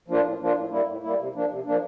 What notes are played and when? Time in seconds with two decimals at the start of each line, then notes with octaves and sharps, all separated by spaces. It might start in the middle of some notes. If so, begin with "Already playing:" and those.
0.08 F3 A#3 D4 F4
0.24 A2
0.40 F3 A#3 D4 F4
0.56 A2
0.71 G3 A#3 E4
0.87 A2
1.03 G3 A#3 E4
1.18 C3
1.35 F3 A#3 D4
1.50 C3
1.66 F3 A#3 D4